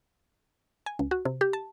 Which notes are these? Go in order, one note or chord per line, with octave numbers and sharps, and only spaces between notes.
G#5
C#2
F#4
C3
G4
A5